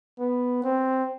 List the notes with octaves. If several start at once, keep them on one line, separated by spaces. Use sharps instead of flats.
B3
C4